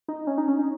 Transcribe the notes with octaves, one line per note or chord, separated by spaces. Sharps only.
D#4
C#4
D#4
C#4
D#4